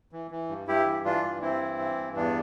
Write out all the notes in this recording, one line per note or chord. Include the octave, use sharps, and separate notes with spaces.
E3
E3
G2
G2 E4 G4
E3
E3 D4 F4
G2
G2 C4 E4
E3
E3
G2
E2 B3 D4